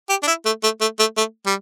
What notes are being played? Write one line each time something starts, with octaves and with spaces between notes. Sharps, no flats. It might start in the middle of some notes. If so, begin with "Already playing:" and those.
G4
D4
E4
A3
A3
A3
A3
A3
G3